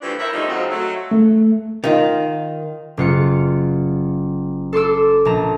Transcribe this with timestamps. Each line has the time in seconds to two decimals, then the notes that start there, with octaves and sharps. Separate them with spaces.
0.01 E3 F3 G3 A3 D4
0.19 E4 A#4 C5 C#5 E5
0.32 D3 F3 G3 A3 D#4
0.49 F2 G#2 C#3 F#3 C4 D#4
0.70 F#3 A3
1.11 A3
1.84 D#3 F4
2.97 F#1 F4 F#5 C#7
4.73 A4 C6 D6 E6
5.25 A#1 A5 A#5